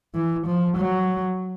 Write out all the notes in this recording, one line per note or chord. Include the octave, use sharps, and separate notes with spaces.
E3
F3
F#3